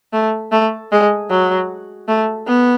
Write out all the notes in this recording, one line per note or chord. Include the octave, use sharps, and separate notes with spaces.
A3
A3
G#3
F#3
A3
B3